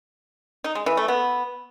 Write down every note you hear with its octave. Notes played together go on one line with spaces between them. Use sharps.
D#4
G#3
E3
A3
B3